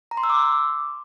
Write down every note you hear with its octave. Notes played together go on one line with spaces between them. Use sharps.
A#5
C6
E6
D6